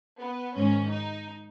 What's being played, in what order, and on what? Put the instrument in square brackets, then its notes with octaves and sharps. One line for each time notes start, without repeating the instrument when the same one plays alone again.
[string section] B3
G#2 D#3 C#4
D#4